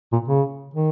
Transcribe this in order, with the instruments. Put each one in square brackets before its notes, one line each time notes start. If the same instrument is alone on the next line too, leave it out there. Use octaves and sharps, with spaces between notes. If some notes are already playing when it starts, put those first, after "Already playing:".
[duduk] A#2
C#3
D#3